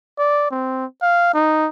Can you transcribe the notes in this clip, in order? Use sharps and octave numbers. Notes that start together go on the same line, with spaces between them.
D5
C4
F5
D#4